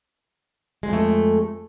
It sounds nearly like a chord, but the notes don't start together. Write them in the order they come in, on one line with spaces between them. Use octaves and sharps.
G#3 F2 A3